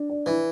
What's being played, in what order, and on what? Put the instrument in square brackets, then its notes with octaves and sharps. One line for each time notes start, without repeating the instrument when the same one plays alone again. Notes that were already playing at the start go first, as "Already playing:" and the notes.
Already playing: [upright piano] D4
D5
[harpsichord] E3 [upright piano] E4